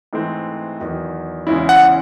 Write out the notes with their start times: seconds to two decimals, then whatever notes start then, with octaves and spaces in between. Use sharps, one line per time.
0.13 G#2 E3 A3 C4
0.80 E2 D#3 F#3
1.47 E2 C#3 G#3 C#4 E4
1.69 F#5